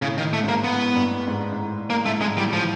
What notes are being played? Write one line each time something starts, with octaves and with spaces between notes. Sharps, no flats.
A2 C#3
D#3
A3
G#2 A#3
G#2 B3
G2
G#2
G#2
A2
A2 A#3
G#2 A3
G#2 G#3
A2 G3
A2
F3